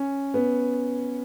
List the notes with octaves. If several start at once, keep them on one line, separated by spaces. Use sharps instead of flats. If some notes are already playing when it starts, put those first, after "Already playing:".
Already playing: C#4
B3